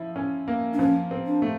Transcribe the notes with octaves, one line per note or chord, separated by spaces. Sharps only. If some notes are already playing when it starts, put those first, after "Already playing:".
Already playing: F3 E4
C#4
A#3
D4
F3 C#4
C4
D4
A3